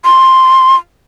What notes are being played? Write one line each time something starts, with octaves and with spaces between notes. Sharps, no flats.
C6